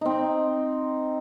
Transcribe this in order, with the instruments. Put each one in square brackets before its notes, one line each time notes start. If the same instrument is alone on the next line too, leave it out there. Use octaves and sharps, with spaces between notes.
[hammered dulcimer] C4 D#4